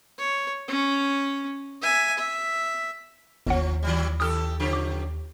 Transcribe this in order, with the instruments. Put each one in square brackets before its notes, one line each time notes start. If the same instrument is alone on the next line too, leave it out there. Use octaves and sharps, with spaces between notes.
[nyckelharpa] C#5
C#4
E5 G#5
E5
[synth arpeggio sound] G1 F#5 [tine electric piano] D#2 [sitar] F3 C#4
[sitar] D#3 F#3 G3
[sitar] D#3 G4 A4 [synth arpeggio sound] D#6 F6
[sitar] C#3 F3 G4
[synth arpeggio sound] D6